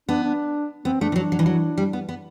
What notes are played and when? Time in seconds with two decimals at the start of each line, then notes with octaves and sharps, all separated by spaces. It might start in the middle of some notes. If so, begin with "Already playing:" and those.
0.09 B3 D4
0.24 D4
0.85 B3 C4
1.01 A3 D4
1.12 E3
1.16 F#3 D4
1.32 F#3
1.39 E3
1.46 F#3
1.78 G3
1.93 B3
2.09 B3